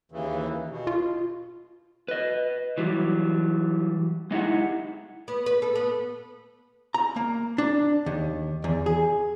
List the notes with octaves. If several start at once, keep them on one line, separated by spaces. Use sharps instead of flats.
D#2 C#3 E3
B2
F4
B4 D#5
E3 F#3 G3
G#3 D#4 E4 G4 F#5
B3
B4
A4
B3
A#5
A#3
D4
D#2
E2
G#4